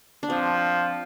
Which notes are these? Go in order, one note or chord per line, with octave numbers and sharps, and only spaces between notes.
D4
F3 C4